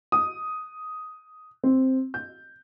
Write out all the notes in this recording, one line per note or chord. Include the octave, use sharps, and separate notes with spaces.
D#6
C4
G6